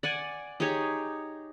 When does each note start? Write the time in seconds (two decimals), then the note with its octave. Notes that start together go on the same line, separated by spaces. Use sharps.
0.03 D5 F#5 G#5
0.60 D#4 G4 G#4 C#5